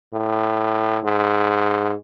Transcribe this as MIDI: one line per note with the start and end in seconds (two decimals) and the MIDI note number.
0.13 0.99 45
1.04 1.94 44